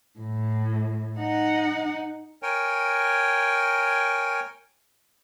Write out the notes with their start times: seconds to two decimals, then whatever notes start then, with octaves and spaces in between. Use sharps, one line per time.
0.20 A2
1.19 D#4 F#5
2.43 A#4 C#5 G5 G#5